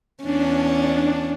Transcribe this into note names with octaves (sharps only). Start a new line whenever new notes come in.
E2 C#4 D4
D4